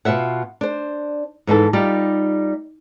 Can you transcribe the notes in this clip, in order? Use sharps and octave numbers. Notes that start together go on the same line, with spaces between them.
B2 F4 E5 F#5
D4 C5
G#2 E3 D#4 A4
G3 D#4 F4 G4